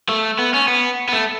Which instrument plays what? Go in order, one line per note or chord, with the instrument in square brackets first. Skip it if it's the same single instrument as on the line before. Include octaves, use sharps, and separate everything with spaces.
[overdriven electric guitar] A3
B3
C#4
B3
B3
A3